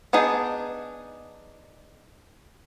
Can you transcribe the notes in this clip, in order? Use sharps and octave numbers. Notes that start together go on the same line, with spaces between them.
B3 D4 D#4 G#4